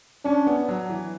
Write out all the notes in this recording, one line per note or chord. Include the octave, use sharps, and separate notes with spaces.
C#4 D4
B3
F#3
E3